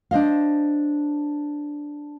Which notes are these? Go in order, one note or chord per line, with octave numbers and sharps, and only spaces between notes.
D4 C5 D#5 F5